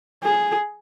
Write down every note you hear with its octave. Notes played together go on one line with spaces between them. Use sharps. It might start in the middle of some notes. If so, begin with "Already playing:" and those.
G#4